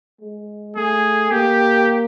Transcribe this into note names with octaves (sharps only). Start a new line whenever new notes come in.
G#3
A3 G#4
A#3 G4